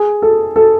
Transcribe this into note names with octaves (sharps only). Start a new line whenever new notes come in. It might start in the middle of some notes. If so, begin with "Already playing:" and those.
Already playing: G#4
A4
A4